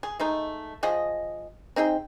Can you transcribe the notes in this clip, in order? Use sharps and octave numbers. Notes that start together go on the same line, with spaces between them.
G#4
G#3 A3 D#4
F3 G#4 D#5
C4 D#4 G#4 G5